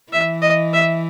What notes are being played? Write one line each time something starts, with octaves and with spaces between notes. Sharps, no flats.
E3 E5
D#5
E5